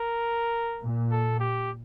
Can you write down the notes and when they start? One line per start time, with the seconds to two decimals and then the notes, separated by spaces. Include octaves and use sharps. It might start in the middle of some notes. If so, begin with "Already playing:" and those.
Already playing: A#4
0.82 A#2
1.11 A4
1.40 G4